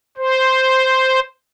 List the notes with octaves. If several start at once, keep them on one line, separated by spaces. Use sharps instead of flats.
C5